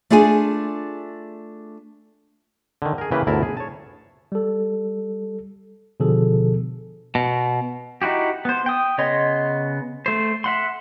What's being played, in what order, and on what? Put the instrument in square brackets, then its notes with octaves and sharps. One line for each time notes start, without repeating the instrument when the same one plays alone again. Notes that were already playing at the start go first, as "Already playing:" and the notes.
[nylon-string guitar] A3 D4 F4 G#4 G#5
[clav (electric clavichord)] D3 D#3
G#4 A#4
C#3 E3 A#3 G4 B4
G1 D2 E4 A#4 A5
G#4
C#5 A5
[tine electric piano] G3 A4
B2 D3 F3 G#4 A4
[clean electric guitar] B2
[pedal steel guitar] D#4 E4 F#4 G4
B3 C5
G5 D#6
C#3 B3 C#5 D#5 C6
A3 C5
E5 F#5 C6